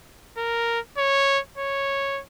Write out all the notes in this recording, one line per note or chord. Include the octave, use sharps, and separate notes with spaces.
A#4
C#5
C#5